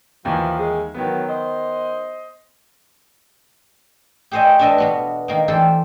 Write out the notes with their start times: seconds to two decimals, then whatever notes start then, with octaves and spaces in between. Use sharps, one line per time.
0.25 D#2 E3 F3
0.58 D#3 G#3 G#4
0.94 D#3 F#3 B3
1.28 C5 D#5
4.31 G4 G#4 C5 C#5 D#5 E5
4.59 D4 A4 B4 D#5 E5
4.78 B2 B3 F#4
5.28 D#3 A#3
5.48 E3 A4 C5 D5 G5 B5